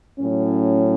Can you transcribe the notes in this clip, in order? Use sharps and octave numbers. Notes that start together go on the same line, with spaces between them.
A2 F#3 C#4